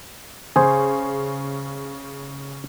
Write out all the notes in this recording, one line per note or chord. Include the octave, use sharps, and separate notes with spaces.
C#3 G#4 C5